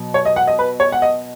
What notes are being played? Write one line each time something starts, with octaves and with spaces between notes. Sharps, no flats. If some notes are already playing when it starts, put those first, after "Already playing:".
Already playing: B2 F#3
C#5
D#5
F#5
D#5
B4
C#5
F#5
D#5